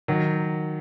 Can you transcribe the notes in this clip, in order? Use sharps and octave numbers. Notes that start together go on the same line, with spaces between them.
D#3 F#3